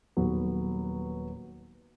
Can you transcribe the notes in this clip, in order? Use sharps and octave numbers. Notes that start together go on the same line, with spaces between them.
D#1 F#3 B3 B4